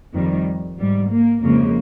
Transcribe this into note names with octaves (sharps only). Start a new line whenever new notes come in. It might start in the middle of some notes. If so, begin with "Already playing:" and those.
F2 D#3 G3
G#2 G3
A#3
F2 C#3 F3 G#3 A#3